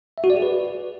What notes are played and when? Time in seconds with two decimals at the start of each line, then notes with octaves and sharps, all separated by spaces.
0.18 E5
0.24 F#4
0.30 D5
0.36 G#4
0.42 B4